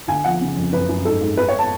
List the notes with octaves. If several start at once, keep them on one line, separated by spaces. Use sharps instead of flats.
D2 G#5
F3 F#5
C#3
F2
F#2 B4
F#2
G#2 A4
G#2
G#2 B4
C#5
A5